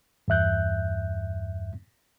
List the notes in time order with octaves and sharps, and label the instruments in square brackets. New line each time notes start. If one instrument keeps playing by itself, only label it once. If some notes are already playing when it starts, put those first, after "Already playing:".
[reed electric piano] E2 G2 E5 F#6 G6